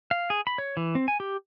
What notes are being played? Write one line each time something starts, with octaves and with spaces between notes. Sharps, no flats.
F5
G#4
B5
C#5
E3
C4
G#5
G4